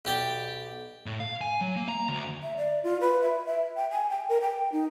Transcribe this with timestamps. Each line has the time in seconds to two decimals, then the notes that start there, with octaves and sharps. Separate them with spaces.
0.05 B1 G4 D5 G5
1.06 A2
1.20 F5
1.41 G#5
1.61 F#3
1.77 A#3
1.89 A#5
2.09 D2
2.41 E5
2.57 D5
2.84 F4
3.01 B4
3.22 E5
3.46 E5
3.76 G5
3.91 G#5
4.10 G5
4.29 A#4
4.42 G5
4.72 D#4